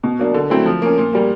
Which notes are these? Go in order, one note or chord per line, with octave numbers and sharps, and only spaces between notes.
B2
F#3 A#3 D4
D3
F#3 A3 C4 E4
F3
A#3 C#4
A#2
G3 A#3